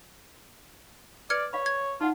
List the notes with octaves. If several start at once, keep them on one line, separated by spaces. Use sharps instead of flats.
B4 D5 F6 G#6 C#7
C#5 D5 F5 B5
G#6
D#4 F4 D5 F#5